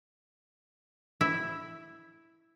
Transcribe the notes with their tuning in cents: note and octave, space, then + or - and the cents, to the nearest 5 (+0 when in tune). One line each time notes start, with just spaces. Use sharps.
E4 +0 E5 +0